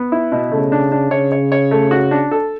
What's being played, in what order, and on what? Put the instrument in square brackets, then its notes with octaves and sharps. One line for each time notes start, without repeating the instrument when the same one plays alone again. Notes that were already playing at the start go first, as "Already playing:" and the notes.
Already playing: [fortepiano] B3
E4
B2
[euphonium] C#3 [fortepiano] A3
[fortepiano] D4
D4
[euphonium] C#3 [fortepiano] C#5
[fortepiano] C#5
C#5
A3
F#4
D4
A4